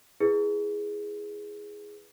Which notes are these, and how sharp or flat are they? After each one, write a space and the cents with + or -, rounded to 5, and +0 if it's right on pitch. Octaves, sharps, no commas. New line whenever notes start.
E4 +0 G#4 +0 B4 -5